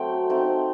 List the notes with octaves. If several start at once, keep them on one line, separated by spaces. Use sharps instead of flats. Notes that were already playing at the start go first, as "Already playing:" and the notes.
Already playing: F#3 A3 C4 G5
A3 C4 D#4